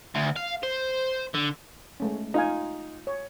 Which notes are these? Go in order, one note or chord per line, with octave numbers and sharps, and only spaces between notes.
D2
F5
C5
D3
G#3 A3 C#4
D#4 F4 F5 G#5
C#5